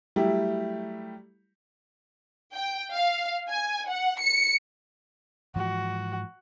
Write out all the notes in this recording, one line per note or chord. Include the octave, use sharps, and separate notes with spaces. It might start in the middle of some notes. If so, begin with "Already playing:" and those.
F#3 G3 A3 E4 G4
G5
F5
G#5
F#5
C#7
G#2 E3 F3 F#4